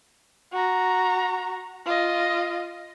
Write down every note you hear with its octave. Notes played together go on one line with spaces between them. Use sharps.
F#4 A#5
F4 D#5